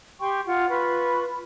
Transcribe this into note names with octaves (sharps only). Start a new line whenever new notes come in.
G4 G5 C6 C#6
F4 F#5
F4 B4 B5 C#6